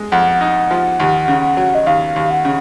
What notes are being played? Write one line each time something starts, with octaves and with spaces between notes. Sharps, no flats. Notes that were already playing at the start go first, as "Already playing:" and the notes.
Already playing: G#3
F2 F#5
D#4
F3
D#2
C#3
F#3
D#5
D#2 F5
D#2
F#5
C#3